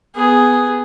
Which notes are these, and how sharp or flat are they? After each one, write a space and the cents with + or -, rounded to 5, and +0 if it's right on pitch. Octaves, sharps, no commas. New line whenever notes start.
B3 +10 G#4 +0